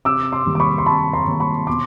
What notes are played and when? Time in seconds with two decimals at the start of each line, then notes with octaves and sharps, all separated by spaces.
0.05 C3 D6 E6
0.32 C6 D6
0.46 D#3 G3 A#3
0.55 D6
0.60 B5 C#6
0.78 C6
0.86 C3 A5 B5
1.13 A#5 C6
1.27 D#3 G3 A#3
1.40 B5 C#6
1.67 B2 C6 D6